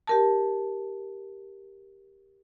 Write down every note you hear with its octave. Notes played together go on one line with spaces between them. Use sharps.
G4 A#4 A5